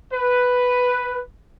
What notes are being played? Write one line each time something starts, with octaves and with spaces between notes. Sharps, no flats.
B4